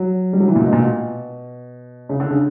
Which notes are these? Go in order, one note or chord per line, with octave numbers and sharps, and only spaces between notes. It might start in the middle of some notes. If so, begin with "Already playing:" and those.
Already playing: F#3
G3
F#3
E3
A#2
B2
A#2
B2
C#3
D3
C#3